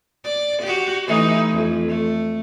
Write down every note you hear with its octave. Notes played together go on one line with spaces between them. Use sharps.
D5
F#4 G4
E3 A3 D#4
F2
A3